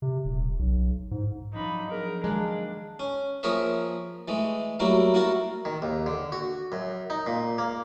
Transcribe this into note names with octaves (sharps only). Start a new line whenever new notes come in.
C3
D#1
B1
G#2
F3 F#3 D4 D#4 B5
B3 G#4 A#4
D#3 G#3 A#3 D4
C#4
F3 A#3 G#4 A#4 C#5 E5
E3 G#3 A3
F#3 G3 A3 A#3 E4 F#4
A#3 E4 F#4 A4 A#4
D#3
D#2
D3
F#4
F#2
D#4
A#2
A#3